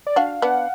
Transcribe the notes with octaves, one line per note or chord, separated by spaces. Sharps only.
D5
D4 F#4 F5
B3 D4 F#5